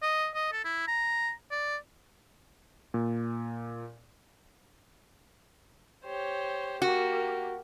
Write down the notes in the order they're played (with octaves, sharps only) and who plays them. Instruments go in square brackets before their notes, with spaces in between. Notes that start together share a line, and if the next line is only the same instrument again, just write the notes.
[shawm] D#5
D#5
A4
E4
A#5
D5
[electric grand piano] A#2
[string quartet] G4 C5 C#5
[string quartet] A#3 G4 A#4 [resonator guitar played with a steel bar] F#4